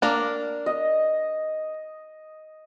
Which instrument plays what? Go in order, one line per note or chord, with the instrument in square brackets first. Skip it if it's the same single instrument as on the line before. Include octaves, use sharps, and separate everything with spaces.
[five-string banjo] A#3 D4 A#4
[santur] D#5